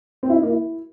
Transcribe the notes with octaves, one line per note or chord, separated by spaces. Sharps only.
C4
E4
D#4
A#3
E4